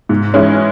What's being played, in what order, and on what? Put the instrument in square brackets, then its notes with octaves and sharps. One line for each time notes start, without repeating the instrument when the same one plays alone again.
[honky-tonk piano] G#2
E3 G#3 C#4